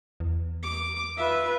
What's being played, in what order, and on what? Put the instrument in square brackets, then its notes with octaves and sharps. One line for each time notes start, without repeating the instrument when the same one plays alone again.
[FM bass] E2
[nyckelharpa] D6
[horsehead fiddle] F4 B4 [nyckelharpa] E5